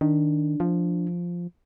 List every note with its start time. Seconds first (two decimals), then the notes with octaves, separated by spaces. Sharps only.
0.01 D#3 D4
0.60 F3